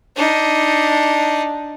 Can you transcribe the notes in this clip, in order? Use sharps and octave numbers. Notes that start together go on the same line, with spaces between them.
D4 D#4